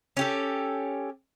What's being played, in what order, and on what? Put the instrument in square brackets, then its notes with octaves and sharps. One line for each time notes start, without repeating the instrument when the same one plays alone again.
[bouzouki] C#4 G4 A4